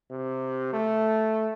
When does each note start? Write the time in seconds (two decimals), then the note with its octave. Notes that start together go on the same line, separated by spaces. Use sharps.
0.11 C3
0.73 A3